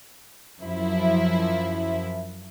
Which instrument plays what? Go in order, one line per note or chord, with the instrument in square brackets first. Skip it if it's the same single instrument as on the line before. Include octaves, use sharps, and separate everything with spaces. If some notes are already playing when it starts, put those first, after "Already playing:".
[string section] F#2 F3 E4